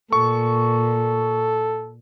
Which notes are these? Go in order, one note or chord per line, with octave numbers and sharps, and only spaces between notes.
A#2 A4 C#6